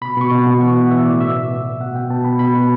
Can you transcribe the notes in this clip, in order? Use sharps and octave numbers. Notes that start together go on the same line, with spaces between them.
B2 B5
B2 C#6
B2
B2
E3 C#6
A2 F#5
E3 E5
A2 D5
B2 E5
B2
B2
B2
B2 F#5
B2 G5
B2 A5
B2 B5
B2 B5
B2